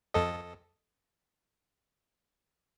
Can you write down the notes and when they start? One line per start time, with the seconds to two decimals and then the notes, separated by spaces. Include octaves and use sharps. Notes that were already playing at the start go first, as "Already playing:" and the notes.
0.14 F2 A4 D#5